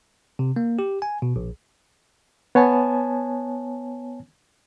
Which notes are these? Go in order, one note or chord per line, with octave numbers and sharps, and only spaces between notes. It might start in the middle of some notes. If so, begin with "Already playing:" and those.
C3
A#3
G4
G#5
B2
A#1
B3 C#5 G#5 A5